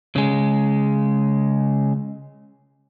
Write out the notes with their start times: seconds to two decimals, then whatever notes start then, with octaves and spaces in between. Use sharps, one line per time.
0.16 C#3 G#3